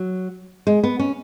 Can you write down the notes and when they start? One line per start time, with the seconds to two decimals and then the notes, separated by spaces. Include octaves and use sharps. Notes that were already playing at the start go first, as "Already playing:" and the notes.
Already playing: F#3
0.67 G#3
0.84 B3
0.99 C#4